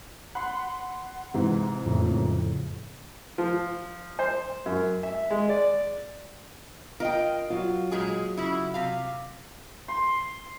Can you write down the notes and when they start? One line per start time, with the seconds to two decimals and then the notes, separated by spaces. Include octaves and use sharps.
0.35 F#5 B5 C6
1.34 G#2 C3 E3
1.86 F2 A2 C#3
3.38 F3
4.19 C5
4.66 F#2
5.03 E5
5.31 G#3
5.49 D5
7.00 F4 A#4 D#5 G5
7.50 F#3 F4
7.91 A#2 G#3 G#4
8.37 C#3 E4
8.74 C3 F5
9.88 C6